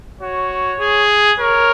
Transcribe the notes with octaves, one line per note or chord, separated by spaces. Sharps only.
F#4 C#5
G#4
A#4 C#5